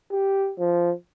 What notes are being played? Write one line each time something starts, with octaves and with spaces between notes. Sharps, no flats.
G4
F3